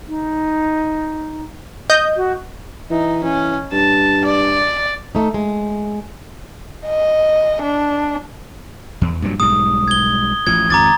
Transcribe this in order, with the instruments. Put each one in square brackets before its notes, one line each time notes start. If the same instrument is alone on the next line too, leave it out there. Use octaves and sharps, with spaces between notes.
[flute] D#4
[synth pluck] D#5 G6
[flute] F#4
[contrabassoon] E3 [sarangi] D#4
[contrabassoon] E3 [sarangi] C#4
[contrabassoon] G2 [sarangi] A5
[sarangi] D5
[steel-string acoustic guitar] A3 D#4
G#3
[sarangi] D#5
D4
[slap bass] E2
G2 A#2 F#3
[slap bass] B1 G#2 G3 [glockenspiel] D#6
[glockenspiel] G#6 G7
[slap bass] A1 F3 [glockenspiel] G#6
[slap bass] G#1 F2 [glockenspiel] A#5 D6 A6